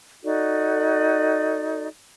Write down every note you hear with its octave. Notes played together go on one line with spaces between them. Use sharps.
D#4 F#4 A4 D5